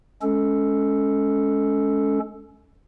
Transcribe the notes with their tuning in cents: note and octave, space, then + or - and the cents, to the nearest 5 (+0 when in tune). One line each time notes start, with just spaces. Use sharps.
G#3 +25 C#4 +20 A4 +0